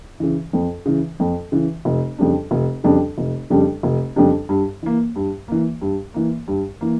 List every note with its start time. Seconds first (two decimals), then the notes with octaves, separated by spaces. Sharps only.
0.20 C#3 E3
0.53 F2
0.86 C#3 E3
1.20 F2
1.52 C#3 E3
1.85 F1
2.18 F2 C#3 G3 D4
2.51 F1
2.84 F2 C#3 G3 D4
3.18 F1
3.50 F2 C#3 G3 D4
3.83 F1
4.16 F2 C#3 G3 D4
4.49 G2
4.83 E3 A#3
5.16 G2
5.48 E3 A#3
5.82 G2
6.14 E3 A#3
6.48 G2
6.81 E3 A#3